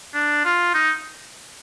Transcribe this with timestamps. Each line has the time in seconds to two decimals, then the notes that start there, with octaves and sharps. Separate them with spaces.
0.14 D4
0.44 F4
0.74 D#4